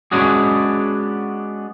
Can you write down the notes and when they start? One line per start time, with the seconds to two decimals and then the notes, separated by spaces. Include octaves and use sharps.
0.12 G#3 B3 C#4 D4 F#4 G#4